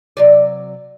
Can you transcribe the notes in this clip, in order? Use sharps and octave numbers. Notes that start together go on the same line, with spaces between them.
C3 F#3 D5